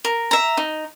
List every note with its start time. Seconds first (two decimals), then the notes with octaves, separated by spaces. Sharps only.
0.05 A#4
0.31 E5 A#5
0.57 D#4